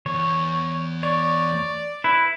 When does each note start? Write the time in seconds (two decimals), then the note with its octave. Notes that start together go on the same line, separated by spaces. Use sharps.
0.06 E2 C#5
1.03 C#5 D5
2.04 E4 B4